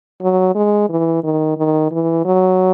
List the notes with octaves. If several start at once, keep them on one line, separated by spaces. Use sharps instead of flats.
F#3
G#3
E3
D#3
D#3
E3
F#3